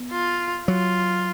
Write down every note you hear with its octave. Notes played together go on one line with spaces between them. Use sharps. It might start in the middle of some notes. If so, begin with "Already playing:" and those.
Already playing: B3
F4
F#3 F4